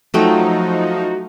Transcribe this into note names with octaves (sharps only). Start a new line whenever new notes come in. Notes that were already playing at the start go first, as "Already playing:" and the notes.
F3 F#3 A3 D#4 F#4 G5